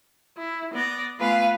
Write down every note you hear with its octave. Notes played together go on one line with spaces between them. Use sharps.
E4
B3 D5 A#6
A3 B3 F4 B4 F5 G#5